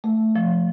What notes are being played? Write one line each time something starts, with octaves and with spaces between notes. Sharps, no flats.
A3
F3